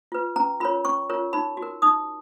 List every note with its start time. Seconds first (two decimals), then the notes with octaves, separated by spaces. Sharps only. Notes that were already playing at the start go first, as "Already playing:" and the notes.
0.12 F4 B4
0.36 C#4 A#5
0.60 F4 A#4 C#5 B5
0.85 C#4 C#6
1.10 F4 A#4 C#5
1.33 D#4 B5
1.57 F#4
1.62 A#4
1.82 D#4 D#6